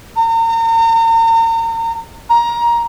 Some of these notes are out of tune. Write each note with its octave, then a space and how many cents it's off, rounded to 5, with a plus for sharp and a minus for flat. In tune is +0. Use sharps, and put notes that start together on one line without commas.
A#5 -35
A#5 +20